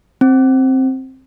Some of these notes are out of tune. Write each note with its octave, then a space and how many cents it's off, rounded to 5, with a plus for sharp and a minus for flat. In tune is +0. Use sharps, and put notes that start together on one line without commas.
C4 +10